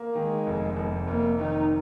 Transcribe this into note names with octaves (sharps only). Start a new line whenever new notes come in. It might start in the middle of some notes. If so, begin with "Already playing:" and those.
Already playing: A#3
D#3 G#3
F1
F1
F1 A#3
D#3 D#4